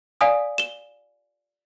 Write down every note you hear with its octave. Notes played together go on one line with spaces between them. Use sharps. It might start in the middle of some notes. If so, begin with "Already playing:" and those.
D5 F5 G#5 D#6
E7 G7